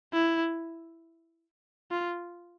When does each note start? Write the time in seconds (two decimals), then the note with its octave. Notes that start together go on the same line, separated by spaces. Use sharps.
0.13 E4
1.91 F4